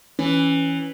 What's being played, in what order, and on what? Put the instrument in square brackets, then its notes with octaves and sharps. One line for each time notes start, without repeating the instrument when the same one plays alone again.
[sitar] E3 [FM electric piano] C#4